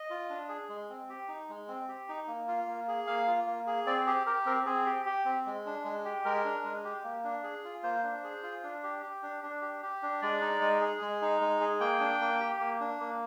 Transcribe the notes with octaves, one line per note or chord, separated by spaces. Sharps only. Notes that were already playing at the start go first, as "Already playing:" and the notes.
Already playing: D#5
F4
D4
G#4
G#3
C4
G4
D#4
G#3
C4
G4
D#4
A#3
F4
A#3
G#4
A#3 F5
F4
A#3
G#4
C4 D5
G4 G#4
G4 A#4
C4 A#4
C4 G#4
G4
G4
C4
G#3
D4
G#3
G4
G#3 A#4
D4
G#3
G4
A#3
D4
G#4
F4
A#3 C5
D4
G#4
F4
D4
G4
G4
D4
D4
G4
G4
D4
G#3 D5
D#4
G#3
G#4
G#3
D#4
G#3
G#4
A#3 G5
D4
A#3
G4
A#3
D4
A#3